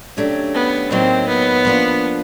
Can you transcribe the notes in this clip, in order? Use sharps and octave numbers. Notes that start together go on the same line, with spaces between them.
C#3 F#3 A3 D4 G4
B3
A2 F#3 A#3 C4 D#4
B3
F3 A#3 D4 F4